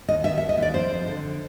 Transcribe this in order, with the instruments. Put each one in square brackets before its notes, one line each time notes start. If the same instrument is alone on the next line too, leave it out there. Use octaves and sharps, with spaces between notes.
[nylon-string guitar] D#2 D#5
D#3 E5
E5
D#2
D#5
D#2
D5
F2 C5
F2
D3